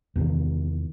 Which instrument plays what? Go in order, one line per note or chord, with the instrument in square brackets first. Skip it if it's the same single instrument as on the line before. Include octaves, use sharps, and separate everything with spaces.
[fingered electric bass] E2 C3 D#3